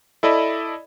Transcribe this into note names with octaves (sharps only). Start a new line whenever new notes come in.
E4 A4 D5 D#5 B5